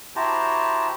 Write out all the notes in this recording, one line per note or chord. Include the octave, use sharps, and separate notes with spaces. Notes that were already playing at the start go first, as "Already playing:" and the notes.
E4 F#4 G4 C5 A5 A#5